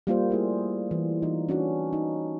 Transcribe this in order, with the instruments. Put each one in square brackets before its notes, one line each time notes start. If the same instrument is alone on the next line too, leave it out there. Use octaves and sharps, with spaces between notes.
[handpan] G3 A#3 F4 C5
A3 E4 G#4
E3
E3 D#4 F4
C#4 D4 F#4
D#4